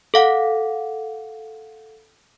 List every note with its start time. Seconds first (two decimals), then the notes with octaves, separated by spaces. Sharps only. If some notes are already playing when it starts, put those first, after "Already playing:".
0.14 A4 F5 F#5